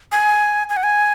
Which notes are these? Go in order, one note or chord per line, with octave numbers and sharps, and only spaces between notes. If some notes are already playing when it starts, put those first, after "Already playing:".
G#5
G#5
F#5
G#5